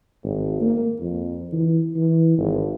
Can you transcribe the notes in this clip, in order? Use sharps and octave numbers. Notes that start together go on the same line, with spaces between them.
G#1
A#3
F2
E3
E3
G#1